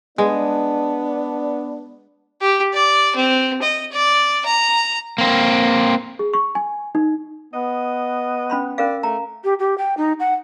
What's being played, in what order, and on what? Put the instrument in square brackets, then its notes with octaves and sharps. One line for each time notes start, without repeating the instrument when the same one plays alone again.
[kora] G#3 [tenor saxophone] B3 [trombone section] D4
[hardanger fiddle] G4
D5
C4
D#5
D5
A#5
[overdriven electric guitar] A#3 C4
[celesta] G#4
C#6
G#5
D#4
[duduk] B3 [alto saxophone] D#5
[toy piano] C#4 B5 C6
[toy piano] C#4 A#4 F5 [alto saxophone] D5
[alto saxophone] A3 [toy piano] A#5
[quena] G4
G4
G5
D#4
F#5